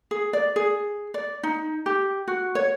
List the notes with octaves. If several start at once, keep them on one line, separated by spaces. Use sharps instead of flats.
G#4
D5
G#4
D5
D#4
G4
F#4
C#5